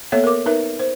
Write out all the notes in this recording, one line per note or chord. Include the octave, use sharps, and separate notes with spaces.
A#3 B3 A4 C#5 E5
A#4 D6
D#4 A#4 B4 E5
C5